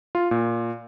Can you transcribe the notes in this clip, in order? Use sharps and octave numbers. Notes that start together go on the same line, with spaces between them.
F4
A#2